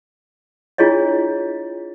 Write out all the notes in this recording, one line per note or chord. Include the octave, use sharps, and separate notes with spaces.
D4 E4 F4 G#4 C#5 D#5